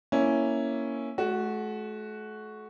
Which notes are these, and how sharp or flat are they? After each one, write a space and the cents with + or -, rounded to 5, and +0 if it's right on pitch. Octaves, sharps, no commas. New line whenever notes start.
A#3 +0 C#4 +0 E4 +0
A3 -40 F#4 +0